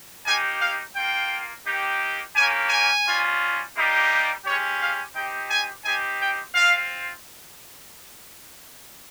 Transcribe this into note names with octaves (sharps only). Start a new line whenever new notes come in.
A#3 D#4 G4 G#5
F5
A#3 F4 G5
A#3 D#4 G4
A#3 C#4 G4 G#5
G#5
G3 C#4 F4
G3 A#3 D#4 G4
G#3 C#4 G4 C#5
F5
C4 D#4 G4 G5
G#5
C4 D#4 G4 G#5
G5
C4 F4 F5